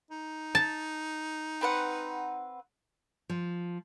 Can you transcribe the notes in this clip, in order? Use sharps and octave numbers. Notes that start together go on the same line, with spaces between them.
D#4
A5
C4 B4 F#5
F3